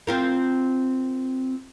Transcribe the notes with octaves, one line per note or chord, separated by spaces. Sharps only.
C4 F4 A#4